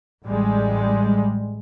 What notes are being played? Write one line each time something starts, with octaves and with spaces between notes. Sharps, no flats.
A1 G3 G#3